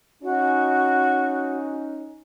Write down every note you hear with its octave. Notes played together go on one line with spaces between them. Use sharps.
C#4 D#4 F#4